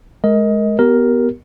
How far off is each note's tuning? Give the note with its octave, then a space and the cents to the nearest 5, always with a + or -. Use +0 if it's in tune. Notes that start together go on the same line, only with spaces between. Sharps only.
G#3 +25 A#4 +0 D#5 +20
B3 -5 G4 -25 A#4 +5